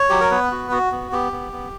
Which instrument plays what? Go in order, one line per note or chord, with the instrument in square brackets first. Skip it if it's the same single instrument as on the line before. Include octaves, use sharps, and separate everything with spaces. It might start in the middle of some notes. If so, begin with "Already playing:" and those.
Already playing: [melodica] C#5
F#3 G4
A#4
B3 B4
F#4
F#4
B3
B3 G4
B3
B3